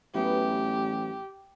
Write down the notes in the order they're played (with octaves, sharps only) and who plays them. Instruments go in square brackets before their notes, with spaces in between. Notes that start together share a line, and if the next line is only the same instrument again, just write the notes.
[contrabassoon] A1 [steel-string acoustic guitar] E3 F#3 B3 [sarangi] G4